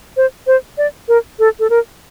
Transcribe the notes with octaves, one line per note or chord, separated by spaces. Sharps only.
C5
C5
D5
A#4
A4
A4
A#4